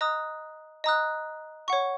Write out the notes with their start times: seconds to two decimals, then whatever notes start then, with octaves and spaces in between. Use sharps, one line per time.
0.01 D#5 A#5 D#6 F#6
0.84 D#5 A#5 D#6 F#6
1.68 C#5 F#5 C#6